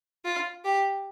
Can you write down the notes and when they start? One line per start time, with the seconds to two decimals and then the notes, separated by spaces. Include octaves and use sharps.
0.24 F4
0.64 G4